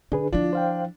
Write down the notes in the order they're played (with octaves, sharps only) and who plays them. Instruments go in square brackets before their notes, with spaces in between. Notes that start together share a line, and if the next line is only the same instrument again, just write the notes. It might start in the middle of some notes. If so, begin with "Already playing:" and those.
[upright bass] D3 [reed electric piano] D4 G#4 B4
[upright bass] F3 E4 [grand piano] D4 [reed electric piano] F4
[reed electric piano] C5 F5 G5